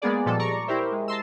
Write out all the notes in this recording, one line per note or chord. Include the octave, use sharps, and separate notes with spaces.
G#3 A#3 B3 G#4 D5
A#2 F3 G3 G#3 A4
D5 A#5 C#6
E4 G4 A#4 C5 E5
G#3
A5 A#5 C6 E6